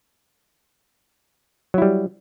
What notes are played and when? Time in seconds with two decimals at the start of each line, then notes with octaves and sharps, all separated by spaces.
1.74 F#3
1.78 E4
1.82 G3